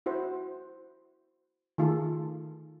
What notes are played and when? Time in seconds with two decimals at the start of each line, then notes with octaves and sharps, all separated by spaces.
0.06 E4 F#4 C5
1.78 D#3 A3 F4 G#4 A4